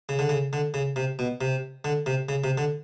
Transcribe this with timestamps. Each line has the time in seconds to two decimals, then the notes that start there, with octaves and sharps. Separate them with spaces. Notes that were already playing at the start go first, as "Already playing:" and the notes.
0.09 C#3
0.19 D3
0.29 C#3
0.53 D3
0.74 C#3
0.96 C3
1.19 B2
1.41 C3
1.85 D3
2.06 C3
2.29 C#3
2.44 C3
2.58 D3